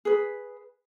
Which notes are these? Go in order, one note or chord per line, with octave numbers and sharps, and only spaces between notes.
G#4 B4